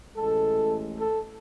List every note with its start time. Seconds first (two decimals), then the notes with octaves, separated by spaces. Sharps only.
0.15 A1 A2 G#3 A4
1.00 A4